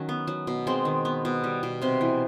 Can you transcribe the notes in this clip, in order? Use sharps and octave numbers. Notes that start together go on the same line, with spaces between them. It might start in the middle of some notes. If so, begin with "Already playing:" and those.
Already playing: D#3 F#3 C#4
B3
F#3
B2
G#3 C4
D#3
B3
B2
G3
B2
C3 C4
E3